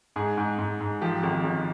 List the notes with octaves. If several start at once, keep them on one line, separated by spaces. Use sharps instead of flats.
G#2 G#4
G#2
G#2
G#2
F3 G4
G#1
G#1